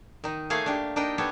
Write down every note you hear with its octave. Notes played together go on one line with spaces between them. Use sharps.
D#3 D#4
A3 A#3 G#4 C#5 F5
D4 G4
D4 D#4 A#4 D#5 G5
B3 G4 A4 C#5